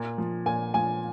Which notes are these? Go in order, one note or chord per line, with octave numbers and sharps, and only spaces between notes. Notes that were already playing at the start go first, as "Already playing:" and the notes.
Already playing: A#2
F3
A#2 G#5
F3 G#5